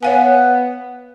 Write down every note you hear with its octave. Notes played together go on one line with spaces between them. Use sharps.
B3 C#5 F5 G#5